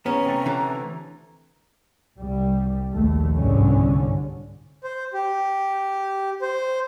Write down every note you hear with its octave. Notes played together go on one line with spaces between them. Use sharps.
E2 B3 C#4 A#5
C3 A3
D3 E3
C2 G3
A#1 D#2 A3
G1 C2 G#2 D3 G3 C#4
C5
G4
C5